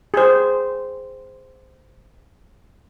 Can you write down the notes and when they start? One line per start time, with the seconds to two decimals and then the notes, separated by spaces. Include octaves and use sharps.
0.14 G#4 C5